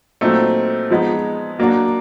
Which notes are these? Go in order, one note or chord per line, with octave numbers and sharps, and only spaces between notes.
A#2 F#3 A3 C4 D#4
F3 G#3 B3 D#4
F#3 A#3 D4 F#4